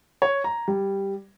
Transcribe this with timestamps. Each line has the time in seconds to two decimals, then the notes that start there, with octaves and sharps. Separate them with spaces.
0.22 C#5
0.44 A#5
0.68 G3